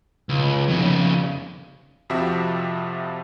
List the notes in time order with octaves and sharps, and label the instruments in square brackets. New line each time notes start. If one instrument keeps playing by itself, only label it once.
[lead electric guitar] C#2
F2 C#3
[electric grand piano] F2 C3 F3 F#4 G4 E5